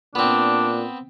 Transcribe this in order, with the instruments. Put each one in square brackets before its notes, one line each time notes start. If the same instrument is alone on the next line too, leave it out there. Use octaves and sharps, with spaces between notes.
[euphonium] A#2 [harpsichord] B3 C4 [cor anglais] D4